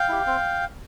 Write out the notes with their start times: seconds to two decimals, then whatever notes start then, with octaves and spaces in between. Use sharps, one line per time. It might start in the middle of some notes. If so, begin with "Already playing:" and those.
Already playing: F5 G5
0.09 E4 G4
0.27 C4